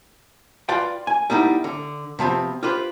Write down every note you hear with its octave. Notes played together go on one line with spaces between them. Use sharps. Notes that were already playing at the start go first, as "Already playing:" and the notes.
F4 B4 D5 F5 G5
G#5
G3 B3 D#4 E4
D3
C3 F3 B3 C4
F4 G4 B4 C5